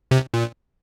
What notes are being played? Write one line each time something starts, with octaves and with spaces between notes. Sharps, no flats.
C3
A#2